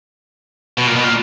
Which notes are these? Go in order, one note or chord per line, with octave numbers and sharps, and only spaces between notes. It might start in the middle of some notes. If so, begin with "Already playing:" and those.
B2
A#2
B2
A#2